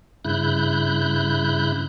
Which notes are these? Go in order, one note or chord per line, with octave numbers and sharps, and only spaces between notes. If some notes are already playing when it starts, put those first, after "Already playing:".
G2 C#3 E4 F#6 G6